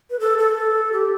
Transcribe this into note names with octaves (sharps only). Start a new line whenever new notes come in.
B4
A4
A4
G4